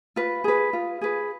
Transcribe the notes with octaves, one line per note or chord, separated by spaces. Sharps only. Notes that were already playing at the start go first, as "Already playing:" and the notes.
F4 B4
G#4 B4
F4
G#4 B4